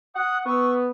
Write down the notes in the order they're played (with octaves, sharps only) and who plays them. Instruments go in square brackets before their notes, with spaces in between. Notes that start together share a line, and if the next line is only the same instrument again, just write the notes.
[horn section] F#5 [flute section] D#6 F#6
[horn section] B3 [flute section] C#6 E6